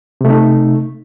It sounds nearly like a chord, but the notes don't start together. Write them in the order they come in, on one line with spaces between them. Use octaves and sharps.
C3 A3 D#4